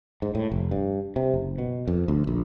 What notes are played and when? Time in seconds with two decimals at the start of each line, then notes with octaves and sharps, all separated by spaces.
0.22 G#2
0.35 A2
0.52 F1
0.71 G2
1.16 C3
1.34 F#1
1.58 B2
1.88 F2
2.08 D2
2.27 A#1